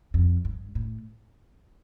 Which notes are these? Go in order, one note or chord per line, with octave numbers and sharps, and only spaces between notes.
F2
G2
A2